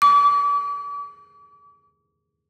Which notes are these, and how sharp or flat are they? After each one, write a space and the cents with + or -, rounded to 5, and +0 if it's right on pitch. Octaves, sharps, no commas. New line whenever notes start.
D6 -40